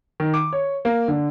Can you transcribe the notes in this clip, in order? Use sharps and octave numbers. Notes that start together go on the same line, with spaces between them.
D#3
D6
C#5
A#3
D3